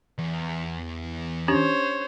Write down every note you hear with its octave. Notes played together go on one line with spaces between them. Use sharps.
E2
C#4 D4 G4 C5 C#5